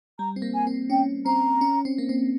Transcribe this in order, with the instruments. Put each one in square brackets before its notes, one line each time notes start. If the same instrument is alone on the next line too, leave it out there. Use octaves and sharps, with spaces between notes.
[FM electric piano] G3 [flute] A#5
[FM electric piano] C4
A#3
[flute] G#5
[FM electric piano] C4
[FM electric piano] C#4 [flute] G5
[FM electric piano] C4 [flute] A#5
[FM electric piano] C#4
C4
A#3
C4